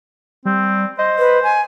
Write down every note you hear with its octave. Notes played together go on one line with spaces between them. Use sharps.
G3 C4
C5 D#5
B4
G#5